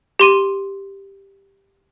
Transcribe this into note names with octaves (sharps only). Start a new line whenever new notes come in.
G4 C6 D#7